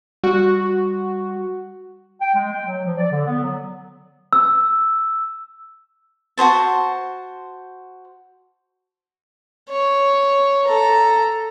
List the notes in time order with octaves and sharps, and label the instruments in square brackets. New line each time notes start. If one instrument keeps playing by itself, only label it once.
[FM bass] G3 [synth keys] F#4
[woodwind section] G5
G#3
G5
F#3
F3
D5
D3
B3
F#3
[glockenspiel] E6
[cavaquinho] F#4 G#4 C5 A5
[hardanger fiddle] C#5
A4 A#5